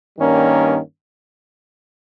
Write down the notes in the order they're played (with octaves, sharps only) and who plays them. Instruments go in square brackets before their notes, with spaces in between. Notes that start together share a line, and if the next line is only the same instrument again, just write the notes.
[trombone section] G2 D#3 G3 A#3 C#4